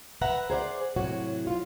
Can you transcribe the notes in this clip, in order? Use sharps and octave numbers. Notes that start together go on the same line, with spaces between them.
B4 E5 F#5 A#5
G#4 C5 D5 F#5
A2 C3 F#3 F#4
F4